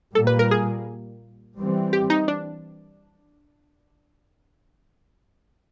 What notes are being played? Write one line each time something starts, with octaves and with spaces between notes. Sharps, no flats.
A#2 G3 A#3 A4
B4
A#4
G#4
E3 G3 C4
G4
D#4
D4